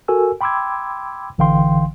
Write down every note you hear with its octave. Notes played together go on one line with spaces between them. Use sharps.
F#4 A4 A#4 G#5 E6
G5 B5 C6 D6 E6 G#6
A1 D3 E3 F5 G5 C6